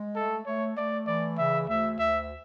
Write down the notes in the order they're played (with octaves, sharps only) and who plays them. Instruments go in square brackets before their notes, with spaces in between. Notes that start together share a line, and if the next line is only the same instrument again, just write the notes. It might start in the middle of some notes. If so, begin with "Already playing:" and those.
Already playing: [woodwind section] G#3
[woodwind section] A3 [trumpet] A4
[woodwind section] A3 [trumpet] C#5
[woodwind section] A3 [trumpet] D5
[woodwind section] E3 [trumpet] D5
[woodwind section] C#3 [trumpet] E5
[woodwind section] D2 [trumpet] E5
[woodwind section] D2 [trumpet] E5